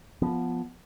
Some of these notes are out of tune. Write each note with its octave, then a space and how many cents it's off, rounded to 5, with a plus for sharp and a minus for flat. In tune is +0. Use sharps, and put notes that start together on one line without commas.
F3 +0 B3 +0